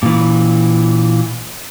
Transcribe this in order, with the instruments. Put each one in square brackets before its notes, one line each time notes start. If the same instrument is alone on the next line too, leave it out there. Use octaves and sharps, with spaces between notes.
[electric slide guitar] A#2 E3